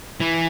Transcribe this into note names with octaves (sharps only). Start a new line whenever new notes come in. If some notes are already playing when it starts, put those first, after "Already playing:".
E3